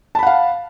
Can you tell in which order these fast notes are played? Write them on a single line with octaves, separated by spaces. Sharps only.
A5 B5 F#5 F5